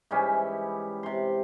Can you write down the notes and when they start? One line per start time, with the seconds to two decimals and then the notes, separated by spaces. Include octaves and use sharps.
0.11 G#2 E3 G3 C#4
1.03 C3 C6